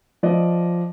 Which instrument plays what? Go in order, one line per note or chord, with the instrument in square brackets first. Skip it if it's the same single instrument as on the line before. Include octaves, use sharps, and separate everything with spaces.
[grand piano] F3 D5 D#5